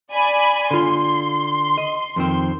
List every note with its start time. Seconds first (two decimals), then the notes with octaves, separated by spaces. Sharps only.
0.12 D5 G#5 B5
0.71 D3 F4 C6
1.78 D#5
2.16 F2 D#3 C4